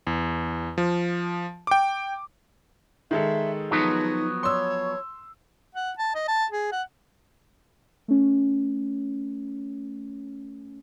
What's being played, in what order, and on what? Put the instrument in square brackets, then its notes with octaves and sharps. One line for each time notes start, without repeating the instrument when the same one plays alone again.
[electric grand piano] E2
F3
G5 D6
[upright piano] D#3 G#3 A4 [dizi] E5
[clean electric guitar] F3 F#3 B3 [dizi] D#4
[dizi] C#5 [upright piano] C6 E6
[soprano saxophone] F#5
A5
D#5
A5
G#4
F#5
[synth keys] A3 C#4